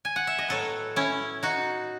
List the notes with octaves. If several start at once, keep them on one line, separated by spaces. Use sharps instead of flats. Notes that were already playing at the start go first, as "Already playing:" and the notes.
G#5
F#5
E5
D#5
A2 F#3 B3 A4 C#5
C#4 E4
D#4 F#4